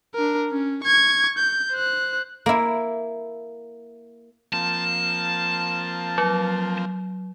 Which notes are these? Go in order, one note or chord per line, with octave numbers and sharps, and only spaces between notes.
D4 A#4
C#4
C#6 G#6
G6
C5 F#6
A#3 E4
F3 A#3 C4 A5
F#3